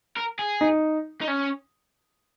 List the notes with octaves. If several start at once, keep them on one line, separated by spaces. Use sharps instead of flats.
A#4
G#4
D#4
D#4
C#4